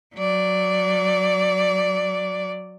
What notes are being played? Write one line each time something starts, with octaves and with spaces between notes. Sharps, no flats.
F#3 D5